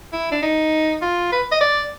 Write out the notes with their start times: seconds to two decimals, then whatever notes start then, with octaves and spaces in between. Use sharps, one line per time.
0.13 E4
0.32 D4
0.42 D#4
1.02 F4
1.32 B4
1.52 D#5
1.61 D5